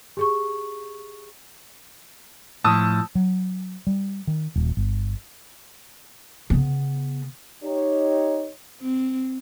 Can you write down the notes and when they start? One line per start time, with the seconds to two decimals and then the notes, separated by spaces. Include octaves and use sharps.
0.17 G4 G#4 C#6
2.64 A2 F3 A5 D#6 E6
3.15 F#3
3.87 G3
4.27 D#3
4.56 D#1
4.77 G1
6.50 C#3 B3
7.64 D#4 G4 C#5
8.81 C4